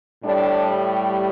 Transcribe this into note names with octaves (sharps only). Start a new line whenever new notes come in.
A2 G3 D4